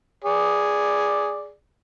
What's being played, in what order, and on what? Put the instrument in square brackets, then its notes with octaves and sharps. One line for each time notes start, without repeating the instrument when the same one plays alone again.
[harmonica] G#4 D5